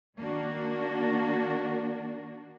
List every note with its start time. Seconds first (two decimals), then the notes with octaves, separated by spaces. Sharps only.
0.18 D#3 A#3 D4 F#4